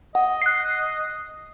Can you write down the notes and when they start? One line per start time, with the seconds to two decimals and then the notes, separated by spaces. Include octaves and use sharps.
0.15 D#5 F#5
0.42 F#6 C7